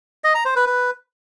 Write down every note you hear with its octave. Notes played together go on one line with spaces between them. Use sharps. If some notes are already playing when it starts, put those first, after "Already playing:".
D#5
A#5
C5
B4
B4